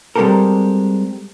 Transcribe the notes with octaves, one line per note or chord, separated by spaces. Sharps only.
G3 G#3 C4 G4 A4 A#4